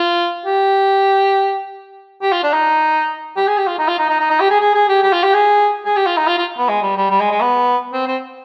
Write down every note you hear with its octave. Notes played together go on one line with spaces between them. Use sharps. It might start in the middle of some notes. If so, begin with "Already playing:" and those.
Already playing: F4
G4
G4
F4
D4
D#4
G4
G#4
G4
F4
D#4
F4
D#4
D#4
D#4
D#4
G4
G#4
G#4
G#4
G4
G4
F4
G4
G#4
G#4
G4
F4
D#4
F4
F4
B3
G#3
G3
G3
G3
G#3
G#3
B3
C4
C4